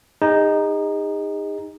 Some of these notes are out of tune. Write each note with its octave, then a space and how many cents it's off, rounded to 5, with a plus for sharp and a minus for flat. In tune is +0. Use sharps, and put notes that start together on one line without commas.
D#4 +0 G#4 -40